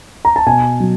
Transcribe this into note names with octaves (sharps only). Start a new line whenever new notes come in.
A#5
A5
B2 G#5
F#3